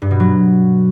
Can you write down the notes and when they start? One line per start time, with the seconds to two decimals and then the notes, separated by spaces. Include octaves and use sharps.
0.02 G2
0.11 B2
0.20 F#3